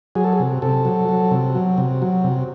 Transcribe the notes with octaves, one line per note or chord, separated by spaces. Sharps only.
F#3 G#4
A4
G#4
C3
C3 A4
F#3
F#3
C3
F#3
C3
F#3
C3